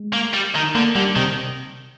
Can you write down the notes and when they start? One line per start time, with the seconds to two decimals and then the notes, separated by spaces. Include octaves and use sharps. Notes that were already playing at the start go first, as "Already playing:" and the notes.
Already playing: G#3
0.13 A#3
0.34 G3
0.55 D#3
0.75 D3 A#3
0.95 D3 G3
1.16 C3 D#3